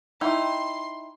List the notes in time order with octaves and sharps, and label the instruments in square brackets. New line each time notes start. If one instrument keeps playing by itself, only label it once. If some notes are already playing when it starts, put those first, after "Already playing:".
[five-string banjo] D#4 E4 G5 [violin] C6